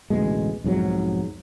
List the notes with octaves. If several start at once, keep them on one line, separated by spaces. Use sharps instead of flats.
A1 D2 B2 G#3
B1 F2 G#2 F#3